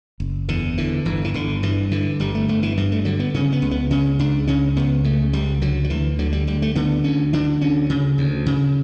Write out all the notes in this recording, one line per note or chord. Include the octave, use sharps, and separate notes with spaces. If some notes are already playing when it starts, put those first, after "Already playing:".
F#1
E2 D3
D3 E3
G1 E3
E3
G1 D3
G2 E3
D3 E3
G1 G3
A3
G1 A3
E3
G2 E3
A3
D3 F#3
B3
C#3 C#4
B3
C#2
B3
C#3 C#4
C#2 D4
C#3 C#4
C#2 B3
C#3 A3
C#2 G3
D3 F#3
F#3
D2 E3
D3 F#3
G3
D2 G3
A3
D3 B3
D2 C#4
D3 D4
D2 C#4
C#3
D2
C#3